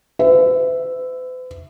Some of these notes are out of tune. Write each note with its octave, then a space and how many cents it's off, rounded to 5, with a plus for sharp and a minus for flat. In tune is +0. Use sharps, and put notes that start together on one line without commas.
B4 +45 E5 +0